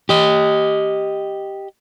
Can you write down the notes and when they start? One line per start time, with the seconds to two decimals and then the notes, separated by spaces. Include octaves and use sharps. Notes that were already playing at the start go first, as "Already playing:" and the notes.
0.09 G4 D#5